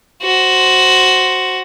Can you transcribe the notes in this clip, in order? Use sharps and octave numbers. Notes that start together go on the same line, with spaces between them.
F#4 C5